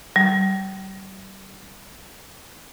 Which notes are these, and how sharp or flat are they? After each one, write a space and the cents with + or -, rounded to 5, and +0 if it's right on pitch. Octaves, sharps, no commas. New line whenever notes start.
G3 -35